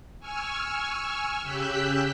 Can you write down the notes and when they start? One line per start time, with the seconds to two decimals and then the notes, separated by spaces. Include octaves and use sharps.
0.20 G#5 C#6 E6 F6
1.43 C#3 G4 E6 F#6 G6 B6